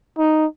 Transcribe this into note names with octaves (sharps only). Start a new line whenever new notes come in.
D#4